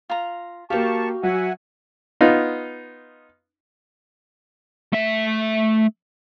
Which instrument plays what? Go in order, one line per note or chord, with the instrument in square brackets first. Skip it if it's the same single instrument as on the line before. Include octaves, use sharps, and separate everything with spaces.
[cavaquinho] F4 A#5
[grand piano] A#3 G4 [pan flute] F#4 [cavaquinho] F5 G5 [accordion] A5 C#6
[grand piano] F#3 [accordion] E5 F#5 G#5
[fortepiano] B3 D#4 F4
[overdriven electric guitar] A3 E5